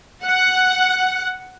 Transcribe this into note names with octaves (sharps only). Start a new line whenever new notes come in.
F#5